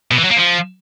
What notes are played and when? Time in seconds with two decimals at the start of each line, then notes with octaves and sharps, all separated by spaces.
0.11 B2
0.18 E3
0.24 F#3
0.31 A#3
0.37 F3